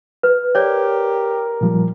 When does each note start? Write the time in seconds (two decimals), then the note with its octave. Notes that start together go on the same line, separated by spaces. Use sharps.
0.23 B4
0.55 G4 A#4 C#5 D5
1.61 A#2 F3 G3